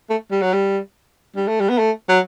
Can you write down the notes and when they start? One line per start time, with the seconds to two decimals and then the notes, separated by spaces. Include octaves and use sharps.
0.10 A3
0.31 G3
0.42 F#3
0.53 G3
1.36 G3
1.48 A3
1.61 G3
1.70 B3
1.79 A3
2.09 F#3